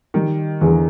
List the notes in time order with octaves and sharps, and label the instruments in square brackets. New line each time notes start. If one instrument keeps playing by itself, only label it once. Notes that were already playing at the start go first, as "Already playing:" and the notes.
[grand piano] D#3 [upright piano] G3
[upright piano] E2 [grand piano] D3